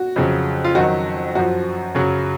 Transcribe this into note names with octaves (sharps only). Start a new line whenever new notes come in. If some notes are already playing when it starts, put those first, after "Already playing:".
Already playing: F#4
F2 C#3 F#3
F4
F2 D#3 F#3 F#4
F#2 F3 F#4
F#2 C#3 F#3